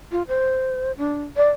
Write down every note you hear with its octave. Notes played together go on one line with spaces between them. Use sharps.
F4
C5
D4
D5